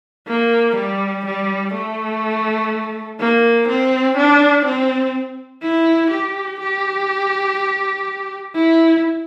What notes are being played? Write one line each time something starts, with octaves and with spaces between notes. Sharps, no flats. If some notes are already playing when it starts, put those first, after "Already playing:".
A#3
G3
G3
A3
A#3
C4
D4
C4
E4
G4
G4
E4